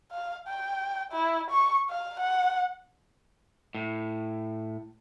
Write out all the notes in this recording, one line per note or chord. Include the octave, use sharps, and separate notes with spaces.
F5
G5
E4
C#6
F5
F#5
A2